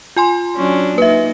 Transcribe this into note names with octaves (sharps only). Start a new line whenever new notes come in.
F4 G#5 C6
F#3 C#4 D4
A#3 D#4 B4 E5